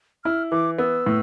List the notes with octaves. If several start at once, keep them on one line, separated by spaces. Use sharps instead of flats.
E4 F6
E3 D6
B3 E6
A2